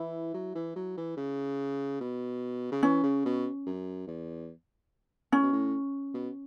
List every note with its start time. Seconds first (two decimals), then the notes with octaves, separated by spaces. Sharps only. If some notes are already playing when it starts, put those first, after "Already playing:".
Already playing: E3 E4
0.34 F#3
0.55 E3
0.76 F#3
0.97 E3
1.17 C#3
2.01 B2
2.72 C#3
2.83 E3 C#4
3.03 C#3
3.25 B2
3.67 F#2
4.07 E2
5.32 A2 C#4
5.43 B2
5.53 A2
6.14 B2